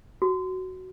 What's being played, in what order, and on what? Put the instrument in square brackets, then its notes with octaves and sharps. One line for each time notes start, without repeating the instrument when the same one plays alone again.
[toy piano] F#4